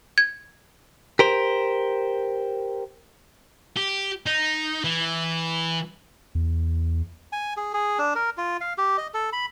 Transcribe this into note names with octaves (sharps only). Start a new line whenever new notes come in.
G#6
G4 A#4 C5
G4
D#4
E3
E2
G#5
G#4
G#4
D4
A#4
F4
F5
G4
D#5
A4
B5